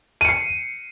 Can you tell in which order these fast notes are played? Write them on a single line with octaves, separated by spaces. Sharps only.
D#7 C#7 C7